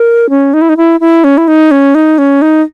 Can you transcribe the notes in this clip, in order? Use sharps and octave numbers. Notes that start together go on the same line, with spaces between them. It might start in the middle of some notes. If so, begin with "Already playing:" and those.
Already playing: A#4
C#4
D#4
E4
D#4
E4
E4
C#4
E4
D#4
C#4
D#4
C#4
D#4